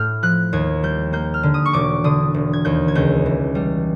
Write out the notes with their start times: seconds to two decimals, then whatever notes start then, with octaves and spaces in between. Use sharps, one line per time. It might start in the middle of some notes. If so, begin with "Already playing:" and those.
Already playing: A2 A3 F6 G6
0.23 F3 F#6
0.53 D#2 G#6
0.83 G3 G6
1.13 A#3 G6
1.34 F6
1.43 D3
1.54 D#6
1.65 C#6
1.73 E1 D6
2.04 D3 D#6
2.34 E1
2.53 G#6
2.65 D#2 G6
2.88 G#6
2.95 C#2 G6
3.26 E3
3.55 G3